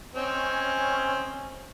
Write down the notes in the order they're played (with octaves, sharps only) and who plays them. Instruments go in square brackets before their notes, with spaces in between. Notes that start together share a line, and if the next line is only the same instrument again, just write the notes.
[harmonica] C4 C#5 D#5 [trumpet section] C#4